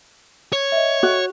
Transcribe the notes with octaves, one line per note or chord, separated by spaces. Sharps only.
C#5
D#5 E5
F#4